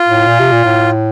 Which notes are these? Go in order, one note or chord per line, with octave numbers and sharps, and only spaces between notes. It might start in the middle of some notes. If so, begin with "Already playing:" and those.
Already playing: F4
A2
A#2
C3
A#2
A2